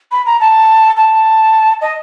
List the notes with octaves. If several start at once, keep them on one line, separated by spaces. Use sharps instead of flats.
B5
A#5
A5
A5
D#5